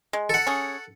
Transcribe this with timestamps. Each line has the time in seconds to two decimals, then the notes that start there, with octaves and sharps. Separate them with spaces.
0.13 G#3
0.30 A4 F#5
0.47 C#4 G#4